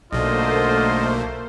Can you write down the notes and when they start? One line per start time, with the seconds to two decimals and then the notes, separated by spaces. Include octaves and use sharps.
0.13 B1 B2 D3 A3 A#3 F4 C5 D#5